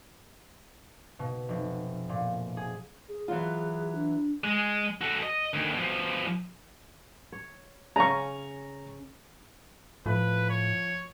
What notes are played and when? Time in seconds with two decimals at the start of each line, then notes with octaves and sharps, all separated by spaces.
1.19 B2
1.49 F1
2.09 A#2
2.57 G#4
3.09 G#4
3.28 E3 F#3 F4
3.95 D4
4.44 G#3
5.01 F#4 A4
5.23 D#5
5.54 D2 D#3
5.74 B2 F3
7.32 C#5
7.96 C#3 C#4 A#5 C#6
10.06 A2 F3 B4
10.50 C#5